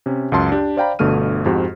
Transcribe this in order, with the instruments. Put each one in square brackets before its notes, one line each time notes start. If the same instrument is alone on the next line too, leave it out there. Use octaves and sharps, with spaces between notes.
[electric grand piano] C3 C#4
C#2 F#2 A5 C6
D4 G4
C5 D5 F5 G5 A#5 B5
G1 B2 D3 A3 F6 D#7
F2 G#2 F#4 G4